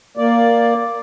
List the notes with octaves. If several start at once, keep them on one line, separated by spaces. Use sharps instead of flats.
A#3 D5